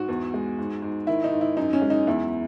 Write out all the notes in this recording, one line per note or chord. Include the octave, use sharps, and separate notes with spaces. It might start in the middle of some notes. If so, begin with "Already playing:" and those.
Already playing: G#2 F#4
E2
G#3
G#2
G#2
D#3 E4
D#4
G#2
E4
F#2 D#4
C#4
G#3
D#4
E2 E4